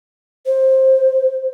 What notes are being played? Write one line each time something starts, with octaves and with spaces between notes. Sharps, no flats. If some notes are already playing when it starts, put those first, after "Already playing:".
C5